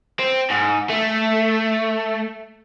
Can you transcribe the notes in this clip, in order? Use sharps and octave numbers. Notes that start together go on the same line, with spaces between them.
C4
G#2
A3